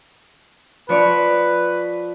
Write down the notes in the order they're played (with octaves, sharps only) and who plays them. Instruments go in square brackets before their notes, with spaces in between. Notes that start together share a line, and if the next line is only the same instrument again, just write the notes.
[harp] F3 C#5 D5 [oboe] B4